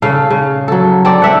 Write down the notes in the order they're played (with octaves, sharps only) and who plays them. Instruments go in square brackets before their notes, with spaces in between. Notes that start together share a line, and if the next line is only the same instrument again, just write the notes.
[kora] C#3 A4 F5
C#3
F#3 A4
C4 A4 D5
C4 E5 F#5